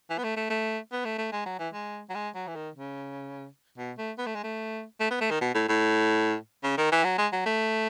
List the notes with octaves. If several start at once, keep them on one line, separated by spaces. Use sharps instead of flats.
E3
B3
A3
A3
A3
B3
A3
A3
G#3
F#3
E3
G#3
F#3
G#3
F#3
E3
D#3
C#3
B2
A3
B3
A3
G#3
A3
A3
B3
A3
D#3
B2
A2
A2
C#3
D#3
E3
F#3
G#3
F#3
A3